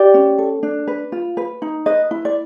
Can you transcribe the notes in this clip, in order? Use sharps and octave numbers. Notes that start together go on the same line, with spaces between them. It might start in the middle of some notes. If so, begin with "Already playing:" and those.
Already playing: G4 D5
C#4
A4
D4
B4
F4
B4
D#4
B4 D#5
E4
D5